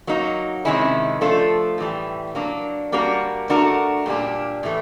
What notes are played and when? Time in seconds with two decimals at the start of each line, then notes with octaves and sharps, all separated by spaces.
0.07 F#3 A#3 D#4 F#4
0.65 C3 D#3 G#3 C#4 E4
1.21 F3 A3 D4 F4 A4
1.78 A2 E3 G3
2.35 F#3 A#3 D4
2.92 G3 A#3 D4 F#4 A#4
3.50 A3 D4 F#4 A#4
4.06 A#2 G3 A#3 D4
4.63 A2 E3 A3